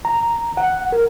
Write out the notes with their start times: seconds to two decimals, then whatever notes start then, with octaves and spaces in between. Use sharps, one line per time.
0.05 A#5
0.57 F#5
0.92 A#4